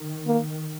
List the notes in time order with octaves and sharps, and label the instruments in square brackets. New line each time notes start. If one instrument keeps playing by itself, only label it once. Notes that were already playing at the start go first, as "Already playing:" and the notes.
Already playing: [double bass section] D#3
[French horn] A#3